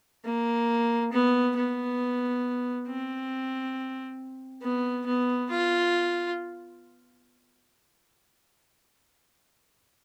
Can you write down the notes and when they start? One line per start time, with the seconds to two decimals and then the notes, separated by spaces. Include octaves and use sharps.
0.25 A#3
1.12 B3
1.56 B3
2.87 C4
4.62 B3
5.06 B3
5.50 F4